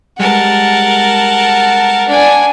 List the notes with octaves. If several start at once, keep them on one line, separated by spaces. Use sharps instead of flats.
G3 G#3 A#4 F#5 A5
D4 G#5